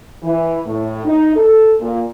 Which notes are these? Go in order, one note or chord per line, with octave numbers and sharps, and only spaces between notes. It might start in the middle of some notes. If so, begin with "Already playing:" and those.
E3
A2
D#4
A4
A#2